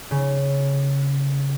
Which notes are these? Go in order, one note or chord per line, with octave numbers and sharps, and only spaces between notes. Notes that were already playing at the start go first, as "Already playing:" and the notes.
C#3